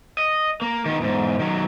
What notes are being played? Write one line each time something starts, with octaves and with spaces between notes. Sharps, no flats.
D#5
A#3
D#3 B3
E2 G#2
D#3 F#3